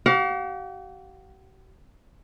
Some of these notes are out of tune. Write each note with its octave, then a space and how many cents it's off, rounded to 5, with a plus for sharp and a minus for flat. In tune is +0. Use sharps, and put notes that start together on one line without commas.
G4 -45 F5 +35